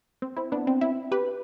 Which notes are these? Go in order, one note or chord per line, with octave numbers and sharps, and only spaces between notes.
C4
C4 E4
B3 D4
C4
C4 E4
G4 B4